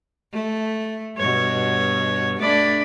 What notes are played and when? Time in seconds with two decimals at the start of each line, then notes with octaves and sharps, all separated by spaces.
0.33 A3
1.17 G2 B2 C#5
2.39 A3 D4 D5 B5